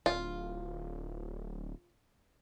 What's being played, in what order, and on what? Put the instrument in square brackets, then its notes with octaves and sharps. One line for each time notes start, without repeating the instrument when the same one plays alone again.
[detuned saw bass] D1 [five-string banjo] F4